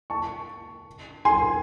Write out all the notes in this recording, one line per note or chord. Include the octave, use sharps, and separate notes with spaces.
A5 C#6
G#5 C6